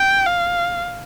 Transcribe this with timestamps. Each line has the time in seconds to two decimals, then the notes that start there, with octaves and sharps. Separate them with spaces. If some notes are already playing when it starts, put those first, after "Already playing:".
Already playing: G5
0.26 F5